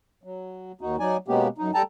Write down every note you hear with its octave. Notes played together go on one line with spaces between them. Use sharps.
F#3
D#2 D#4 F#4
F#3 D#4 D5 G#5
B2 G#3 A#3 B3 C#4 G4
F#2 D#4
G3 A4 G5 A5 A#5